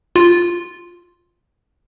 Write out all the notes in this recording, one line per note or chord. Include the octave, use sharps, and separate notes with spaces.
F4